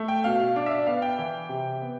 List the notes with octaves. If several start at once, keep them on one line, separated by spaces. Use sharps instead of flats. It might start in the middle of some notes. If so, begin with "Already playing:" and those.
Already playing: A3
G5
B2 F5
F5
D4
E5
D5
B3 F5
G5
E3
C3
B3